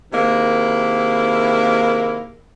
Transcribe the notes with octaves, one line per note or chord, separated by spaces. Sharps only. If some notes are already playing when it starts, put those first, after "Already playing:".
C3 D#3 G#3 A#3 E4